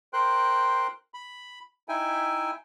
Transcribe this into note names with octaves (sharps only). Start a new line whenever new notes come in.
A#4 C5 G5 C6 F#6
B5
D#4 E4 E5 G5 G#5